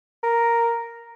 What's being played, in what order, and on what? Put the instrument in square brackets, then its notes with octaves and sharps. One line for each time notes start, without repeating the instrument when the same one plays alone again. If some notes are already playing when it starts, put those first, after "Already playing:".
[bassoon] A#4